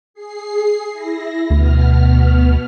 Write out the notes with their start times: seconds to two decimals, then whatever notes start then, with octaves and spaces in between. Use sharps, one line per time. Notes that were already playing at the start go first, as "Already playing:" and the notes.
0.14 G#4 C7
0.93 E4 A#6
1.50 D2 B2 B3 F6